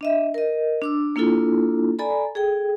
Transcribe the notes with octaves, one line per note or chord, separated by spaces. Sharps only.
D4 D#5 E5
A#4 D#5
D4 D6 E6
A#3 D4 E4 F4 A4
A4 D5 G#5 A#5 B5
G#4 A4 G5